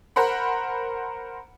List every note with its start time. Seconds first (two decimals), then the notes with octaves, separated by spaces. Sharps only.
0.16 A#4 C5 F#5 B5